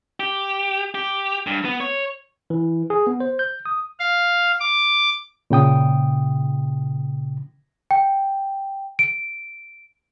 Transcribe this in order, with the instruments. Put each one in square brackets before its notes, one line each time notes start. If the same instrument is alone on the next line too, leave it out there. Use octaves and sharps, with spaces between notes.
[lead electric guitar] G4
G4
G2
B3
C#5
[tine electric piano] E3
G#4
B3
C5
G6
D#6
[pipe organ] F5
D6
[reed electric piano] A#2 C#3 G5 D#6
[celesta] G5
D7